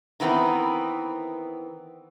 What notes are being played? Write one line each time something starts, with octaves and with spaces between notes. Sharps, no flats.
D#3 E3 B3 C4 A#4